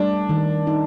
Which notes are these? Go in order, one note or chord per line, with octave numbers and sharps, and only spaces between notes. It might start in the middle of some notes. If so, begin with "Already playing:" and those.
Already playing: G3 A3 D4
D#3
D#4